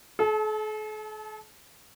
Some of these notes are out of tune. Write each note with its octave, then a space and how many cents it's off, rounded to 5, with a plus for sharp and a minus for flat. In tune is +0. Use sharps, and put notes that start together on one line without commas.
A4 -45 A5 -15